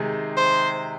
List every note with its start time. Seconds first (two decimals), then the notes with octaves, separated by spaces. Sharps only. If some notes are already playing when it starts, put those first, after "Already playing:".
Already playing: C3 D#3 G#3 D#4 G#4
0.37 C5